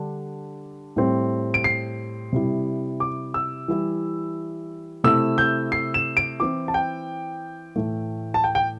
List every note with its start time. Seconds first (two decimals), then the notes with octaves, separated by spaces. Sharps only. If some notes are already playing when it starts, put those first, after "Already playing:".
Already playing: D3 G3 D4
0.96 A2 G3 C4
1.54 D7
1.64 C7
2.33 C3 G3 E4
3.00 D6
3.34 E6
3.68 E3 G3 E4
5.04 C3 A3 E4 E6
5.38 G6
5.72 C7
5.94 E7
6.17 D7
6.40 E3 C4 E4 D6
6.68 A5
6.74 G5
7.76 A2 E3 A3
8.34 A5
8.44 G5
8.55 G5